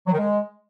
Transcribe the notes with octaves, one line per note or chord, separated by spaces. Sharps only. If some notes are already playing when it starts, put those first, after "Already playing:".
F#3
D#3
G#3